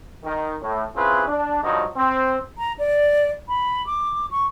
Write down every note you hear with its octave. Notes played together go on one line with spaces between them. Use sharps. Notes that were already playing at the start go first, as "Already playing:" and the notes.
D#3
A2
C4 C#4 E4 F4 G#4 B4
D4
G2 F3 F#3 D#4
C4
A#5
D5
B5
D6
C#6